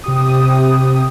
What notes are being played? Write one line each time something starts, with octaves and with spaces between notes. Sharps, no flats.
C3 G4 D#6